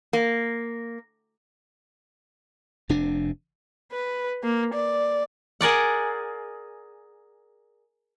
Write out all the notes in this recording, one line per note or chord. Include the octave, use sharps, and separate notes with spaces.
A#3
F1 C3 D4
B4
A#3
D5
G#4 A#4 D5 F#5